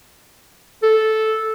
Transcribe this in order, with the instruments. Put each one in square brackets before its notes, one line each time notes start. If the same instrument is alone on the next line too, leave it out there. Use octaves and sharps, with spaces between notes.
[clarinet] A4